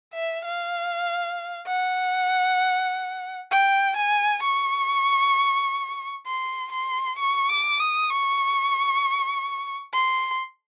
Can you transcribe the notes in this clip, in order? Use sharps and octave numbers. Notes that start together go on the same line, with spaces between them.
E5
F5
F#5
G5
G#5
C#6
C6
C6
C#6
D6
D#6
C#6
C6